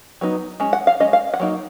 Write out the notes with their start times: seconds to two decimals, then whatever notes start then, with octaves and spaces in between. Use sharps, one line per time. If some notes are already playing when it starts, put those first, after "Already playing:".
0.21 F#3 B3 D#4
0.60 G#3 C#4
0.73 F#5
0.87 F5
1.00 G#3 C#4 D#5
1.13 F5
1.34 F#5
1.40 F#3 A#3 D#4